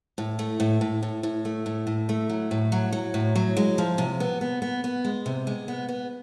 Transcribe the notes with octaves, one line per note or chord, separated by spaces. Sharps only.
A2
A3
A2
A2
A2
A2
A3
A2
A2
A3
F#3
A2
F#3
F#3
A2
F#3
G#3
F3
C3
B3
B3
B3
B3
G#3
C3
G#3
B3
B3